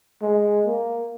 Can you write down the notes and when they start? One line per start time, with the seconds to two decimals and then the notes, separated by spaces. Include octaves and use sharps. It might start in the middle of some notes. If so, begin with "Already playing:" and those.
0.22 G#3
0.66 A#3